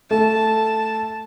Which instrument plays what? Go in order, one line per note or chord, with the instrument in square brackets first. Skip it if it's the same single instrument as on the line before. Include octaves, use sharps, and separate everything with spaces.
[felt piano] A3 [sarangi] A5